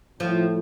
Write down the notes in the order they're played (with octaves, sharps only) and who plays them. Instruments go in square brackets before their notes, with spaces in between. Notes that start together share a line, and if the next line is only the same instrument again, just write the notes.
[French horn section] A2 [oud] F3